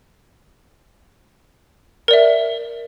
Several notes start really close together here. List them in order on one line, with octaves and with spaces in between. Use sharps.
A#4 D5 E5